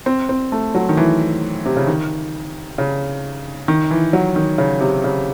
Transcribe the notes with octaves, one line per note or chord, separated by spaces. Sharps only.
C4
C4
A3
F#3
D#3
E3
C3
C#3
D#3
C#3
D#3
E3
F#3
D#3
C#3
C3
C#3